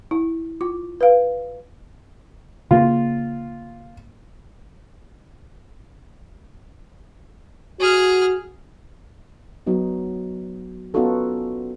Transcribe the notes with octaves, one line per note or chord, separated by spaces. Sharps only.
E4
F4 D6
B4 F5
C#3 A#3 F4
F#4 G#4 F6
F#3 B3 D#4 F#4
B3 C#4 D#4 F4 F#4 A4